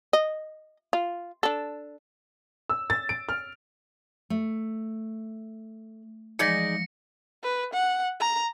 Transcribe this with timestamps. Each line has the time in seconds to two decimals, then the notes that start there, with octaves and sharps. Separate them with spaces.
0.13 D#5
0.93 F4
1.43 D4 A4
2.70 E6
2.90 A6
3.09 D7
3.29 F6
4.30 A3
6.39 E3 F3 G#3 D#4 G#4 D5 A#6 C#7
7.44 B4
7.73 F#5
8.20 A#5